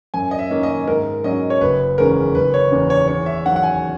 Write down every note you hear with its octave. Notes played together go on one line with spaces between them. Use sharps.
F#2 G#5
D#5
E5
D#3 A#3 C#4
D#5
G#2 A#4
F#3 C#4 D#5
C#5
F#1 B4
E2 D#3 G#3 C#4 A#4
F#1 B4
C#5
E2 D#3 A#3 C#4
C#5
E2 C#5
E5
D#3 F#3 F#5
F#5
G#5